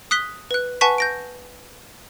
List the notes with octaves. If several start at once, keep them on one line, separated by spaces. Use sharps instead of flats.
D#6 F#6 B6 G7
B4 F#6
B4 F#5 G#5 A5 C#6 B6
G6 A#6 D7